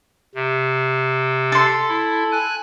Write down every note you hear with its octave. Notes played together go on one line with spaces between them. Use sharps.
C3
A4 C6
E4
G#5 F#6